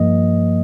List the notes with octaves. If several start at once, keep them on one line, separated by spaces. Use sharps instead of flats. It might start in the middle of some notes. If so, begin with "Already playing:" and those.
Already playing: G2 F3 A#3 D#5